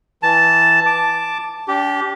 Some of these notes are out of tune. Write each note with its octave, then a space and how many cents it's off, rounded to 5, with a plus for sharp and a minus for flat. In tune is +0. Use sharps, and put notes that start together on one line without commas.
E3 +0 A5 +0
A5 +0 D6 +0
D4 -40 G4 -10